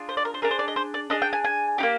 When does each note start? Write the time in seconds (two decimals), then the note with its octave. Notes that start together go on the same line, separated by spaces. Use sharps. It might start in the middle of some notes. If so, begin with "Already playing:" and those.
Already playing: D4 F4 G#4
0.09 C5
0.17 D5
0.25 A#4
0.34 C5
0.42 D4 G#4 A#4
0.51 C5
0.59 D5
0.68 D#5
0.76 C5
0.94 D5
1.10 D4 G#4 D#5
1.22 G5
1.33 G#5
1.44 G#5
1.78 D#4 G4
1.83 A#3